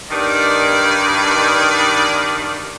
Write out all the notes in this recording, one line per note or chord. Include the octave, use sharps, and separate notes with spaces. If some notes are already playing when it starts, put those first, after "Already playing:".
G2 D#3 D5